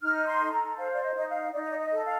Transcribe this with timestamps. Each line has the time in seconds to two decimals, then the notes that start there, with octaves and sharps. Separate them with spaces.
0.01 D#4 F6
0.26 C6
0.39 A4
0.52 A#5
0.77 C5 F5
0.93 D5
1.03 D#5
1.15 D#4 D#5
1.29 F5
1.53 D#4 D5
1.62 D#5
1.71 D5
1.79 D#5
1.91 A4
2.04 F5